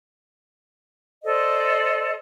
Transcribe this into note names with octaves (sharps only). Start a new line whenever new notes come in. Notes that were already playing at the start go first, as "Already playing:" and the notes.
A4 C5 D5 D#5